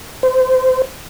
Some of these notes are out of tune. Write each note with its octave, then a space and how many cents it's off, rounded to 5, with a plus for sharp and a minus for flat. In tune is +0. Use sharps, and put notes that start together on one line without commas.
C5 -25